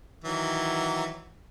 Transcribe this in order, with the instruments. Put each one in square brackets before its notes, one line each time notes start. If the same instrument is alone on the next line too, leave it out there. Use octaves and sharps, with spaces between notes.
[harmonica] D#3 E3 F#3